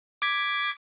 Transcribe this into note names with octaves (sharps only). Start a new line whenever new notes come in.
D6 G#6 B6